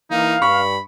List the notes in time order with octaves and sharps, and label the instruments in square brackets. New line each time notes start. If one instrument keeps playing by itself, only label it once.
[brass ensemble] E3 A#3 [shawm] D#4 [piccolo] F5
[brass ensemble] G2 [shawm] B5 [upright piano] C#6